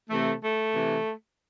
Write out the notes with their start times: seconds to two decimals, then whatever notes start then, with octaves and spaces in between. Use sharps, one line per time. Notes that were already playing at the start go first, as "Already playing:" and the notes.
0.10 C3 E3 A3
0.42 A3
0.74 C3 E3